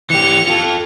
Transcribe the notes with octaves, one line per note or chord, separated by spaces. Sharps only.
E3 G4 C#7 F7
F4 A4